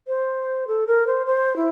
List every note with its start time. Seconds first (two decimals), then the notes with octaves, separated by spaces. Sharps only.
0.07 C5
0.67 A4
0.87 A#4
1.07 C5
1.26 C5
1.56 E4